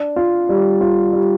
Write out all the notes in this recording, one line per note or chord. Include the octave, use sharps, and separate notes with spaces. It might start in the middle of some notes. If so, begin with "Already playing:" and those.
Already playing: D4
F4
G3
F4
G3